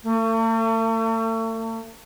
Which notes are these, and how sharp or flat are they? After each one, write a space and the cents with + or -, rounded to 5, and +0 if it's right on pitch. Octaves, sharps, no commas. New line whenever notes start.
A3 +40